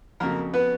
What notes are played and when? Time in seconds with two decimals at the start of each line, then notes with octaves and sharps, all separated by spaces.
0.20 F2 C#3 F#3 A#3 A#4
0.54 B3 B4